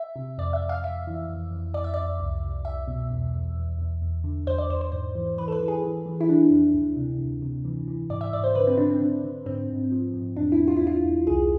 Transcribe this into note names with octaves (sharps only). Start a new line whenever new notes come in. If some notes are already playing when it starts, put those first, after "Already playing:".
Already playing: E5
C3
F2 D5
E5
F2
F5
F2 E5
E3
F2
F2
F2 D5
E5
F2 D5
C2
C2
C2 E5
B2
E2
E2
E2
E2
E2
D3
E2 C5
D5
E2 C5
C5
G#2 C5
E3
E3 B4
A4
B4
E3
G#4
E3
E3
E4
E3 D4
F2
D2
C3
D2
C3
E3
E3
G#2 D5
E5
G#2 D5
C5
D3 B4
C4
D3 D4
C4
D3
D3
G#2 C4
G#2
F3
G#2
E2 D4
E4
E2
F4
E2 E4
F4
E2
C2 G#4